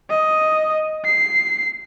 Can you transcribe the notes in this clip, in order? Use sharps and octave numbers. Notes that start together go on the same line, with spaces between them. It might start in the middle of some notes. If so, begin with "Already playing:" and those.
D#5
C7